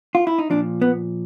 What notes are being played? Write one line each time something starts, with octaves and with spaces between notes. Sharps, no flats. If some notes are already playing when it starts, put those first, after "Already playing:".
F4
E4
D#4
A#2 F3 D4
B3